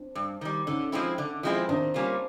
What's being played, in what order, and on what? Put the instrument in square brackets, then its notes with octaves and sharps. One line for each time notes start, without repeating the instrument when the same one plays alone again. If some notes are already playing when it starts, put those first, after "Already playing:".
Already playing: [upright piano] C4 D4
[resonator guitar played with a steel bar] G2
D#3 G3
[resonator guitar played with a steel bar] D3 [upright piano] C#4 D#4
[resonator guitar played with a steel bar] F3 G#3 C4 E4
D3
F3 G#3 C4 E4
[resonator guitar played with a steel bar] D#3 [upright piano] C4 D4
[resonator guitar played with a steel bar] G3 A#3 C#4 F4